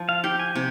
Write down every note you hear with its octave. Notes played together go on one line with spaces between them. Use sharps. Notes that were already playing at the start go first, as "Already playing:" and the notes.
Already playing: F3
F5
G4 G5
G#5
C3